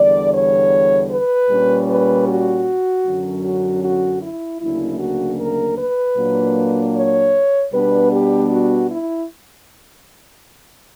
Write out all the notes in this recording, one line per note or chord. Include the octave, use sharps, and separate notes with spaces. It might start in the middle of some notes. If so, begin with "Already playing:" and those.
Already playing: E2 D3 G3 D5
C#5
B4
A#2 G3 C#4
B4
F#4
F#2 D3 F#3 C#4
F#4
F#4
E4
D2 C#3 F#3 A#3 D4 E4
F#4
A#4
B4
A#2 F#3 A#3 D4
C#5
B2 G3 B3 D4 B4
G4
F#4
E4